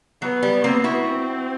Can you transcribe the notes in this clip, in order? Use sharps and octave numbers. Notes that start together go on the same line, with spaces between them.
F#3 B3
G3
A#3 C4
E4 F#4
C4